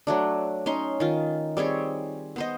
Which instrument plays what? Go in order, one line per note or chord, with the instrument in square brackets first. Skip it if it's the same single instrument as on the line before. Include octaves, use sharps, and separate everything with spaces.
[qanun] F#3 A3 D4
C#4 D#4 C6
D#3 F4
G3 C4 G#4 C#5
B3 C5 D#5